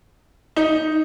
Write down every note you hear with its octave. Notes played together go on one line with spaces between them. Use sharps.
D#4